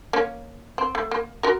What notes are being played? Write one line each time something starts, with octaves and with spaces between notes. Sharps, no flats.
A#3 C#4
C4
A3
A#3
F#4 A#4